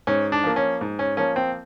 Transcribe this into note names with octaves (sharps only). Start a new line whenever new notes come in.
G#2 C#4
D4
F3 A#3
C#4
G#2
C#4
F3 A#3 C#4
C4